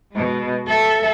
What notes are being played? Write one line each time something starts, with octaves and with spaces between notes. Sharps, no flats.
B2 G#3
A4 E5